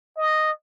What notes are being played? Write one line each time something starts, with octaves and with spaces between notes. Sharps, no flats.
D#5